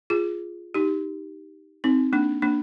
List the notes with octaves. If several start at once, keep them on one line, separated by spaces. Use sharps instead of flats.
F4 G#4
D#4 G4
C4 D#4
A#3 D4
A#3 D4